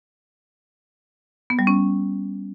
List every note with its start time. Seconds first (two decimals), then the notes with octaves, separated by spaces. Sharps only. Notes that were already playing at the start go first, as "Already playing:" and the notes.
1.50 B3
1.59 G3
1.67 C#4